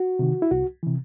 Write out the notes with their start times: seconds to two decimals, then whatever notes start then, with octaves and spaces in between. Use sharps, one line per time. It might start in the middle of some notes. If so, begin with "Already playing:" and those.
Already playing: F#4
0.19 C3 D#3
0.42 E4
0.51 C2 F#4
0.83 C3 E3